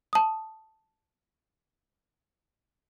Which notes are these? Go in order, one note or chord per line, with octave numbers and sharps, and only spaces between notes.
A5 D#6